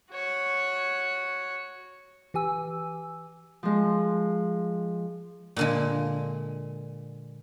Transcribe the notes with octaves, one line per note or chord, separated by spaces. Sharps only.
F#4 C#5
E3 G4 G#5 E6
F3 G#3
A#2 D3 G#3